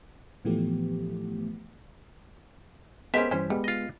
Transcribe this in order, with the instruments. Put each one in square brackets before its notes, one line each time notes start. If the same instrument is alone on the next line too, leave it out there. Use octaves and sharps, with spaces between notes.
[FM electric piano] A2 E3 F3 A3 B3 G4
[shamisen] G#3 A#3 C#4 [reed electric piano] B3 A#4 C5 [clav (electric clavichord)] G4 E5
[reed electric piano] G2 E3 G3 [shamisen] C#4 C5
[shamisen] G3 [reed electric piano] G#3 B3
[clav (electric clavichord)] F4 D#5